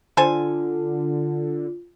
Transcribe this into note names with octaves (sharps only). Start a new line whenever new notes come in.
D3 F4 A4 C5 G#5